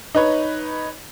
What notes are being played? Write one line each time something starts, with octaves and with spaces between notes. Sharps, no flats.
D#4 B4 C#5